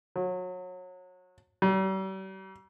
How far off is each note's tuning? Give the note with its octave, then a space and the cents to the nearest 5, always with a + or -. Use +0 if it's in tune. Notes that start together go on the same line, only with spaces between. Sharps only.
F#3 -25
G3 -40